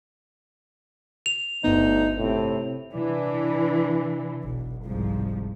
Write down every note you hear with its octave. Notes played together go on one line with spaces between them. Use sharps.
F7
G1 D2 B3 D#4
A2 C3
C3 E3 D4
F#1 B1
C2 G#2 F3